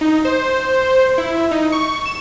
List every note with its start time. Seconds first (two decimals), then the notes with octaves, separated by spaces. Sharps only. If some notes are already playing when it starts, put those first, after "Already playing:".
0.01 D#4
0.25 C5
1.18 E4
1.51 D#4
1.72 C#6
2.05 E7